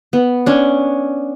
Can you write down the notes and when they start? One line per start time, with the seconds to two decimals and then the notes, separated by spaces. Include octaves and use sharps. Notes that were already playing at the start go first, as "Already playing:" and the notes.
0.13 B3
0.46 C#4 D4